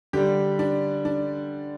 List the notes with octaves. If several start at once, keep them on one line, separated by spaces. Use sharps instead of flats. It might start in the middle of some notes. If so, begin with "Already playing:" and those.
D3 G3 G4
D4
D4